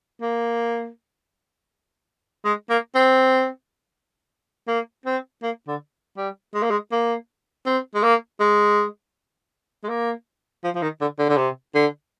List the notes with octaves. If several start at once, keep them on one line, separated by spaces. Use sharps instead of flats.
A#3
G#3
A#3
C4
A#3
C4
A#3
D3
G3
G#3
A#3
G#3
A#3
C4
G#3
A#3
G#3
G#3
A#3
F3
F3
D#3
D3
D3
D3
C3
D3